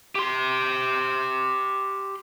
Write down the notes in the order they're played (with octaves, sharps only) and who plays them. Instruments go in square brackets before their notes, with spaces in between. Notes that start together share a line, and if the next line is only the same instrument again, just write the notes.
[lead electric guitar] G4 C6